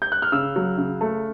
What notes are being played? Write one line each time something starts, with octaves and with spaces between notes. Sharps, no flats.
G6
F#6
F6
C#3 E6
F#3
C#3
A3